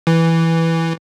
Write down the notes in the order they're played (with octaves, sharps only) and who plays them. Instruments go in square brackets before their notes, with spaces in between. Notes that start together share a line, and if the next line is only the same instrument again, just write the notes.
[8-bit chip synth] E3